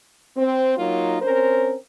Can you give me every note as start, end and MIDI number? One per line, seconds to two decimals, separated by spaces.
0.36 0.73 60
0.77 1.18 54
0.77 1.18 58
0.77 1.18 63
0.77 1.18 65
1.22 1.74 60
1.22 1.74 61
1.22 1.74 70
1.22 1.74 72